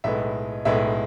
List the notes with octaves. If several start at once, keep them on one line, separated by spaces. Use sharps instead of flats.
B1 A2 G#3 B3 E5
B1 A2 G#3 B3 E5